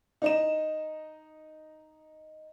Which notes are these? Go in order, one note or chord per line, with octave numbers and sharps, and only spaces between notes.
D#4 D#5 E7